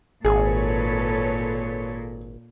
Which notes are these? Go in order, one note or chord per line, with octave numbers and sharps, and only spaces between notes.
G#1 A#2 G#4 A4 B4 C#5